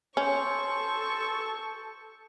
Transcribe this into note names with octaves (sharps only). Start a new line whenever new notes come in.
C#4 A4 C5 C#6